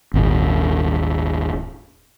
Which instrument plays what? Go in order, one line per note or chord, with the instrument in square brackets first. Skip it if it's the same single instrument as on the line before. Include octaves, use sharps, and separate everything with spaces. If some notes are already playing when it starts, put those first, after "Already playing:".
[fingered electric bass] D#1 G#1